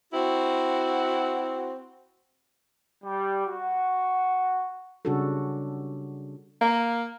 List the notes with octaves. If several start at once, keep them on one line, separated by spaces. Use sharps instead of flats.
C4 E4 F#4
G3
F#4
C#3 G3 D4 F#4 G#4 A4
A#3